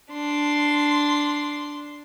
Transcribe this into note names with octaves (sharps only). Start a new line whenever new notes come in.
D4 C6